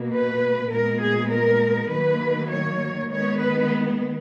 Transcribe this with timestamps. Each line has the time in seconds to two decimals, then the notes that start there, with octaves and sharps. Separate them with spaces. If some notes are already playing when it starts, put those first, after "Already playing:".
Already playing: B2 A#3
0.12 B4
0.71 A#2 G#3 B3 A#4
1.01 G#4
1.30 A#4
1.90 D#3 F#3 A#3 B4
2.50 C#5
3.10 D#3 G#3 B3 C#5
3.40 B4